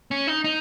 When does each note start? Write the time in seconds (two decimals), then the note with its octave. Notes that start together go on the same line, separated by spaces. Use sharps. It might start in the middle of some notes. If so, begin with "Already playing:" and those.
0.11 C#4
0.27 D#4
0.44 D#4